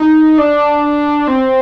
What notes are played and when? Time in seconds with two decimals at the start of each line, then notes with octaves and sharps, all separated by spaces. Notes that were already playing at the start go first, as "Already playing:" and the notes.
Already playing: D#4
0.38 D4
1.28 C4